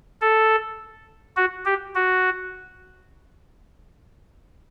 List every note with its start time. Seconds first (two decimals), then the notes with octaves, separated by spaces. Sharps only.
0.21 A4
1.37 F#4
1.65 G4
1.95 F#4